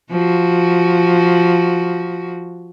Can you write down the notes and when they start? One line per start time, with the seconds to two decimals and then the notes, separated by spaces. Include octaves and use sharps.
0.11 F3 F#4